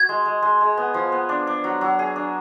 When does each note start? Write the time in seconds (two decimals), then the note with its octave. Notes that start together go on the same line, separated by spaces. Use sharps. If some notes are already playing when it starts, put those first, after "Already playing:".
Already playing: F#4 G#6
0.09 G#3
0.25 G#3
0.42 G#3
0.61 G#3
0.77 B3
0.94 F3
1.12 B3
1.29 D4
1.47 D4
1.64 F#3
1.81 F#3
1.99 G#4
2.16 D4